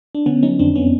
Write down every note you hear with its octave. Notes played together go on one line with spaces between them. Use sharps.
D4
D3 B3 C#4
F#3 C#4 D#4
F2 C4 D4
B3 C#4